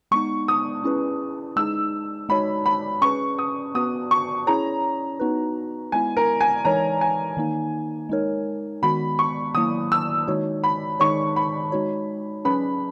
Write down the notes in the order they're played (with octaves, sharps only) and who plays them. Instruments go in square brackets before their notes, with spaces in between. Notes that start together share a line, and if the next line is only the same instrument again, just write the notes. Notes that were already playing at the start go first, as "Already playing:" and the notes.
[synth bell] G#3 B3 D#4 [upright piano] C#6
[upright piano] D#6
[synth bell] C#4 E4 G#4 B4
[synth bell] G#3 D#4 G#4 [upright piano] E6
[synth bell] G#3 D#4 F#4 C#5 [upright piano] B5
[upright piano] B5
[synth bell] C#4 G#4 B4 [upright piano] C#6
[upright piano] D#6
[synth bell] B3 F#4 B4 [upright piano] D#6
[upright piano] C#6
[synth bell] C#4 E4 G#4 C#5 [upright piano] A#5
[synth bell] B3 D#4 F#4 B4
[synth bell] G#3 B3 E4 [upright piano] G#5
[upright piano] A#4
G#5
[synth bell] E3 G#3 D#4 A#4 C#5 [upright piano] A#5
[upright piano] G#5
[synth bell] D#3 A#3 D#4
G#3 D#4 A#4 C#5
[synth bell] D#3 G#3 B3 F#4 [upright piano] B5
[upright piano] C#6
[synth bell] D#3 F#3 A#3 E4 [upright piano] D#6
[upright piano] E6
[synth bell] D#3 G#3 D#4 F#4 C#5
[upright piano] B5
[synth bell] D#3 G#3 D#4 G#4 C#5 [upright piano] C#6
[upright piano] B5
[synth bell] G#3 D#4 F#4 C#5
[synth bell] F#3 C#4 G#4 B4 [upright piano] B5